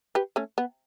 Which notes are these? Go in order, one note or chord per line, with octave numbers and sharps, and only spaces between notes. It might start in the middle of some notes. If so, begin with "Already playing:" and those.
G4 B4
A3 C#4
B3